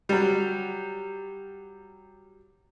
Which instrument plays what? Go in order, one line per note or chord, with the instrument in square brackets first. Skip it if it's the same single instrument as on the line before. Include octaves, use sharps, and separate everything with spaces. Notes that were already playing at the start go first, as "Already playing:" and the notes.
[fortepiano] F#3 G3